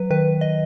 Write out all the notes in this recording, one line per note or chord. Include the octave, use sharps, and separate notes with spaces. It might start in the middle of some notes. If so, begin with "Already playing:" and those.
Already playing: F#3 B4
D#3 B4
D#5